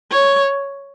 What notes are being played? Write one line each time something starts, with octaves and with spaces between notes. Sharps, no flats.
C#5